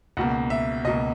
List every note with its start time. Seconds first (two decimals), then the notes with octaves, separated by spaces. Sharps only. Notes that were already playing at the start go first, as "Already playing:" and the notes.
0.17 C#2 B2 A#3 F#5
0.50 E5
0.85 C#2 B2 A#3 D#5